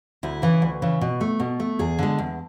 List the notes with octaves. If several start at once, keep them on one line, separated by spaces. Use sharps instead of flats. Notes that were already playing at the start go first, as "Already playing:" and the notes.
D2 E4
C#3 E3
D2
C#3 E3
B2
A3
B2
A3
E2 G#4
D3 G#3
E2